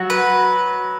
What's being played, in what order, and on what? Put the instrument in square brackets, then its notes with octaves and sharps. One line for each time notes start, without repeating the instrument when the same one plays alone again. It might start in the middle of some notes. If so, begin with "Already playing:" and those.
Already playing: [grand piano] F#3 [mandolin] F#4
[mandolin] B4